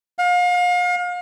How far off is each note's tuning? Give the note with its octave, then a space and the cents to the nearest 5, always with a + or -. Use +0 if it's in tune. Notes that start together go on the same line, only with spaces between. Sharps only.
F5 +35